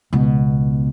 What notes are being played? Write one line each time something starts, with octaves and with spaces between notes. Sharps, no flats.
C#2 B2